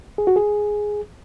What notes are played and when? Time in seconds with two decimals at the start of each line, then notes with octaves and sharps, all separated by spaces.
0.18 G#4
0.27 F#4
0.36 G#4